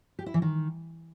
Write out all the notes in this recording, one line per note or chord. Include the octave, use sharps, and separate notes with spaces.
G4
E4
E3
D#3